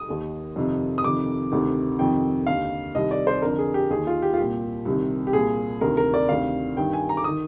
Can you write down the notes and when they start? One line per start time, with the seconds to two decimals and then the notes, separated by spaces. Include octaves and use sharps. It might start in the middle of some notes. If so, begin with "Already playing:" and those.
Already playing: D#6
0.09 D#2 D#3
0.56 F2 C3 D#3
0.98 D#6
1.04 F2 C3 D#3 D6
1.52 D2 C3 D#3
1.99 F2 C3 D#3 G5
2.47 D#2 D3 F5
2.95 C2 C3 D#3 D#5
3.11 D5
3.27 C5
3.42 F2 D3 A#4
3.59 G#4
3.74 G4
3.90 D#2 D#3 G#4
4.07 F4
4.22 G4
4.34 F4
4.38 C2 A#2 G4
4.85 C2 C3 D#3
5.27 G4
5.33 C2 A#2 G#4
5.81 D2 C3 D#3 A#4
5.97 A#4
6.14 D5
6.29 D2 C3 D#3 F5
6.77 G2 D#3 G5
6.93 G#5
7.09 A#5
7.17 D6
7.24 D#3 D#6